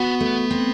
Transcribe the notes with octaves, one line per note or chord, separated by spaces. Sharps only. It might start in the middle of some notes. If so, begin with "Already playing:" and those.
Already playing: B3 F#4
A3
C4